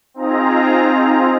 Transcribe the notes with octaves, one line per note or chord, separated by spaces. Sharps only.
C4 D#4 F4 G#4 A#5